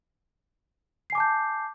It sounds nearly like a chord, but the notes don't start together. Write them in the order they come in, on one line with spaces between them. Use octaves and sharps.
C7 G#5 D6 A5 G6